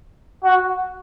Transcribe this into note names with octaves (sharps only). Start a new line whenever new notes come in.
F#4